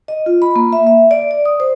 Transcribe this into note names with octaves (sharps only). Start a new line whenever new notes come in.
D#5
F4
B5
A#3
E5
E5
D5
D5
D#6
C5